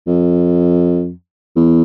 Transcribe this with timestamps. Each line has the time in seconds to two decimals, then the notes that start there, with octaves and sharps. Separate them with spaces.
0.07 F2
1.56 E2